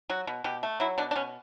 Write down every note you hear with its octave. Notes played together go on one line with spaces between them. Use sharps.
F#3 F#4
B2
B2 G4
A3
F#3 E4
B2 D4
D4
B2 C#4